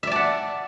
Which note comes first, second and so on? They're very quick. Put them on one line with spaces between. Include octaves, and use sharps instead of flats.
E5 D5 A5 F#5